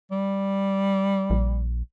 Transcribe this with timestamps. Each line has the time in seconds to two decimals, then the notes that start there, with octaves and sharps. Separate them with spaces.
0.11 G3
1.30 A#1